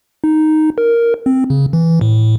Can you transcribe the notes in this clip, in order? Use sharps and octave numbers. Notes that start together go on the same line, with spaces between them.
D#4
A#4
C4
C#3
E3
A2